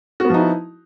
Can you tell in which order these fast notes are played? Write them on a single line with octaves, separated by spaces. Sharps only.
F#4 B3 F3 D#4 E4